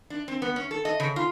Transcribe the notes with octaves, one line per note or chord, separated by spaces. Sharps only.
D4
C4
B3
C#4
A4
D#5
C#3
F4